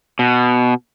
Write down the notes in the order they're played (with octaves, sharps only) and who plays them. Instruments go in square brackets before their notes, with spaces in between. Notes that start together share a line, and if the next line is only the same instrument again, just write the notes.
[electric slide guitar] B2